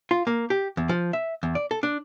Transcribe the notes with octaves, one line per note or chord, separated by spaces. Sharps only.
F4
A#3
G4
E2
F3
E5
E2
D5
A4
D4